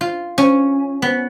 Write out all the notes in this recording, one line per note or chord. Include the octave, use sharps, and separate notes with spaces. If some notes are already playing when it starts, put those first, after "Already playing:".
F4
C#4
B3